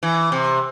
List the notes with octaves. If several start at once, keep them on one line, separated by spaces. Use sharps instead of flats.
E3
C3